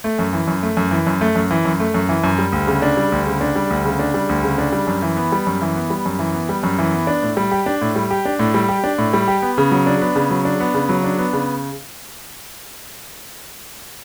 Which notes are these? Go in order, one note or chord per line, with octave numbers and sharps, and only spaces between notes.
A3
F#2
E3
F#2
A3
F#2
E3
F#2
A3
F#2
E3
F#2
A3
F#2
E3
F#2
G3
D2
C#3
D4
G3
D2
C#3
D4
G3
D2
C#3
D4
G3
D2
C#3
D4
G3
F#2
E3
B3
G3
F#2
E3
B3
G3
F#2
E3
B3
G3
F#2
E3
B3
D4
A2
G3
G4
D4
A2
G3
G4
D4
A2
G3
G4
D4
A2
G3
G4
B3
C#3
F#3
D4
B3
C#3
F#3
D4
B3
C#3
F#3
D4
B3
C#3